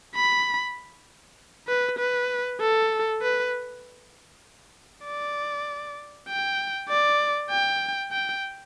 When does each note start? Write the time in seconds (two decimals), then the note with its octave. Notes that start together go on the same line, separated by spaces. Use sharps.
0.15 B5
1.68 B4
1.99 B4
2.61 A4
3.22 B4
5.05 D5
6.28 G5
6.89 D5
7.50 G5
8.12 G5